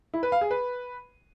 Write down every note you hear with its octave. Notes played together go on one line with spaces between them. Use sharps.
E4
B4
F5
G#4
B4